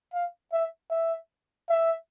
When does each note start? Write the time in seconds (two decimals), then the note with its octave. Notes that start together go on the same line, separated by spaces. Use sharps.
0.13 F5
0.53 E5
0.91 E5
1.69 E5